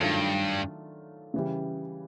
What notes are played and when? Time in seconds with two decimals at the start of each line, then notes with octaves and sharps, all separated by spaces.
0.01 G2 D#3 F#3 A3 D4 F4
1.34 C#3 E3 G3